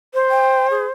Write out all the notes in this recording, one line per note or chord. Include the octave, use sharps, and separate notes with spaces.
C5
G5
G#4